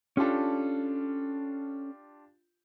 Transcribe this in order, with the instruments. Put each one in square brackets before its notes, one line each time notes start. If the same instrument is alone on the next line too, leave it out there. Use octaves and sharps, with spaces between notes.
[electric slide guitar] C#4 A4 [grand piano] D4 F4 G4